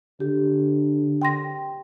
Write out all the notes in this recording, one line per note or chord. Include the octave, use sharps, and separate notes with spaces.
D3 G4
G5 C6 A#6